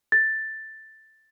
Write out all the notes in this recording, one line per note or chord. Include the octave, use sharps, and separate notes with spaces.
A6